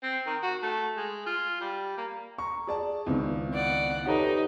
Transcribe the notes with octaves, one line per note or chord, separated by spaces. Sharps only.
C4
D#3
F#4
A3
G#3
F4
G3
A#3
A#5 C#6
G#4 D5 A5
C#2 D#3 B3 C4 E4
D5 F#5
D#4 G4 A4 B4 C#5 F#5